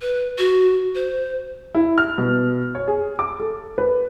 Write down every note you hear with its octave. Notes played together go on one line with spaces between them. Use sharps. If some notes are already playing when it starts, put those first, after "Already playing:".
B4
F#4
C5
E4
F6
B2
C#5
G#4
D6
A4
B4